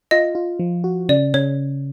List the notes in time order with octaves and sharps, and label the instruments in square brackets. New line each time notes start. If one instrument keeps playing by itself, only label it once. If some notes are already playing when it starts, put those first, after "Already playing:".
[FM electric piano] F4 [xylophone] D#5
[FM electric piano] F4
F3
F#4
[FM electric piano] C#3 [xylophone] D5
[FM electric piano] C#3 [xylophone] C#5